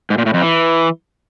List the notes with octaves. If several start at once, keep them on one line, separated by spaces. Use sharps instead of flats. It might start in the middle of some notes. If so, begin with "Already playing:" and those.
G#2
A#2
A2
F2
E3